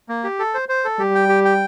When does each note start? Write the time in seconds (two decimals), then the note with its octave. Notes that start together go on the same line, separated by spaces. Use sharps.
0.09 A#3
0.24 G4
0.39 A4
0.54 C5
0.69 C5
0.84 A4
0.99 G3 G4
1.15 G5
1.29 G4
1.45 G5